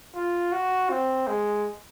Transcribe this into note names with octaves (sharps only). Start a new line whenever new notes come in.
F4
F#4
C4
G#3